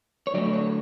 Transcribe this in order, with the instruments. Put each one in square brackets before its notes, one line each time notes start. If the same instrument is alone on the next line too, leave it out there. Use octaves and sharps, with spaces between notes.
[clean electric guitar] C#5
D3 F#3 A3 D5
C#5